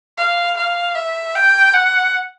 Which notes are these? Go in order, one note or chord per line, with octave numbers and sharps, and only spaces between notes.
F5
F5
E5
G5
F#5